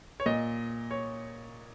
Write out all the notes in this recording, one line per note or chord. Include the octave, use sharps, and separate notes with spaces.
C#5
A#2 D#5
C#5